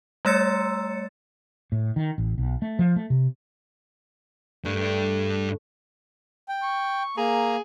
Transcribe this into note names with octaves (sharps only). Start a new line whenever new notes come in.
G3 A3 C#5 E6 A6 C#7
A2
D#3
A1
B1
A3
F3
A3
C3
G2 A3 D4
G5
C#6
A#3 G#4 A#5